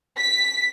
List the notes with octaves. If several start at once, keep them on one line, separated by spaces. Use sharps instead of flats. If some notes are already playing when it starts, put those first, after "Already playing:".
B6